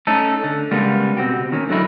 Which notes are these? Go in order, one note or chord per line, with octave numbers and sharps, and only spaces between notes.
A3 C#4 D#4 A4
D3
C#3 G3 G#3 A#3 B3
B2 C4 F#4 G4
D#3 A#3 C#4
D2 D3 F#3 D#4 E4